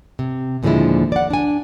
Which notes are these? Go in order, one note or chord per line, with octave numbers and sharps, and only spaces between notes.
C3
D#2 A#2 D3 F3 G#3 E4
D5 F#5
D4 G#5